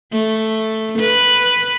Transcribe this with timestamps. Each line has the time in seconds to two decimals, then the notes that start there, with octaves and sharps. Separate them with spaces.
0.12 A3
0.98 B4